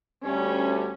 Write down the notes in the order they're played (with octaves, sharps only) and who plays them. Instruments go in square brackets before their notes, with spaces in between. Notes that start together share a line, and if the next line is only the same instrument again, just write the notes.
[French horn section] D2 G3 [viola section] C#4